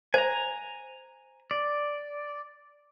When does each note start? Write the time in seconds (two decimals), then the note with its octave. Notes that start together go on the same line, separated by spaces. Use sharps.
0.14 C5 G#5 A#5
1.51 D5